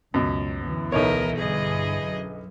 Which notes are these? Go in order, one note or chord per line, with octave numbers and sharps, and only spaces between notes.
C#2 F#2 B2
D2 E3 B3
B1 D#4 A#4 C#5 D#5 E5
G2 D3 E3 G#4 D#5
F#2